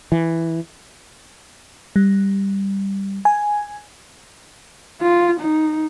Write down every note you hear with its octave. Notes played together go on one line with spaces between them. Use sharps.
E3
G3
G#5
F4
D#4